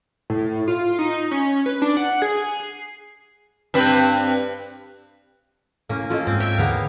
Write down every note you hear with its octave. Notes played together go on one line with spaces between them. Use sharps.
A2
F4
D#4
C#4
B4
D4
F#5
G#4
C7
G2 C4 B4
A2 A#3 C#4
A#3 C#4 F4 A4 D#5
G#2 C4
C#5 E5 G5
D#2 D3 A#3 B3 G#4 F5